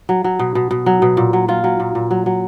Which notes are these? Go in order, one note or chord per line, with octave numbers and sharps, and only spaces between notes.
F#3
F#3
B2
B2
B2
F#3
B2
A#2
F#3
F#3 F4
F#3
A#2
A#2
F#3
F#3